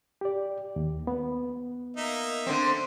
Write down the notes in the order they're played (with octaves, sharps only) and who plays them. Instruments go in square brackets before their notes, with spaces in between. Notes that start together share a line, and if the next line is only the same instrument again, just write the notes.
[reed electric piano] G4 D5
D#2
B3
[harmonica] A#3 D#4 E5
[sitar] D3 C4